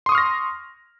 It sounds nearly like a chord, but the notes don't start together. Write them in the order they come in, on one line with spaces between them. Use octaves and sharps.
C6 D#6 C#6 F6 A#6